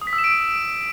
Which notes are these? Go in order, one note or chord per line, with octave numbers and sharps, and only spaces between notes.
D#6
B6
E6
E7
D7